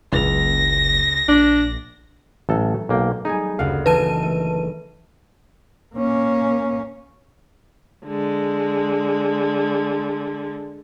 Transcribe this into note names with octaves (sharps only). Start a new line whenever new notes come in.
F#1 C#2 B4 A#6 F7
A#1 D4
A1 F#3 A3 A4
B1 A#3 G5
G3 B3 D#4 G#4 G#5
F#1 D2 F5 F#5
E3 D#4 B4 A5 D#7
A3
A#3 C#4
D3 G#3